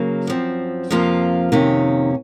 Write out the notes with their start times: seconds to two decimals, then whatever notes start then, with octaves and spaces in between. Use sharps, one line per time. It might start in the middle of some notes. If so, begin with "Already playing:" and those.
Already playing: C#3 F#3 A#3
0.27 F#2 F3 C4
0.90 F2 C3 F3 A#3 F4
1.52 F2 C3 D#3 A#3 C#4